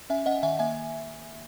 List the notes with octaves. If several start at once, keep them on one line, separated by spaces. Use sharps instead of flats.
C#4 E5 G#5
C#4 D#5 F#5
D#3 E5 G#5
A#3 E5 G#5